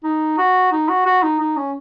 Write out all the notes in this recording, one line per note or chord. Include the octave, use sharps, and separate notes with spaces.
D#4
F#4
D#4
F#4
F#4
D#4
D#4
C#4